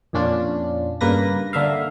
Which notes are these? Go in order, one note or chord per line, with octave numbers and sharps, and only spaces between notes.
F2 A#2 C#4 D4 F4
G2 C#3 A#3 B4 A#6
D3 A#3 E5 F5